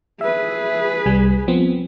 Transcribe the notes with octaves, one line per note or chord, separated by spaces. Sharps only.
G#4 B4 E5
C2 G3 G#5
F3 B3 C4